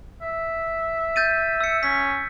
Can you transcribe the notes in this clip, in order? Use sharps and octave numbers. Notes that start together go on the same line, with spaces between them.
E5
G6 A6 D#7
E6 C#7
C#4 B6